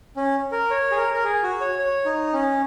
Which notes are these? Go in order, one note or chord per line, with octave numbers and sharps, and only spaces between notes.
C#4
A#4
C#5
G#4
A#4
A#4
G#4
F#4
C#5
C#5
D#4
C#4